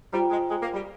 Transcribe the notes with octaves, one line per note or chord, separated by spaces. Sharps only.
G3 F4 C5 G5 A#5
G#3
G#3
A#3
G3